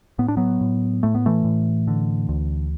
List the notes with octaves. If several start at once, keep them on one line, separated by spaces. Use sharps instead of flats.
A2 B3
D4
F#3 B3
A2
A2 A3
B3
E3 A3
A2
D3
D2